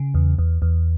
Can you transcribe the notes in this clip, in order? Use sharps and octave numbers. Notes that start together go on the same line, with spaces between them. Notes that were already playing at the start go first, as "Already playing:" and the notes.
Already playing: C#3
E2
E2
E2